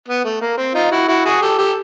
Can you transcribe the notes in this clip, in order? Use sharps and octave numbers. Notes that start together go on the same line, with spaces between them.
B3
A3
A#3
C4
D#4 F4
E4 F#4
E4 F#4
F#4 G#4
G4 A4
G4 A4